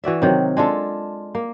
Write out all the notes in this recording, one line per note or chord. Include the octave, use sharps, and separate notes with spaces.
E3 F#4 D5 E5
C3 D#3 F#3
G#3 D4 F4 A4
A#3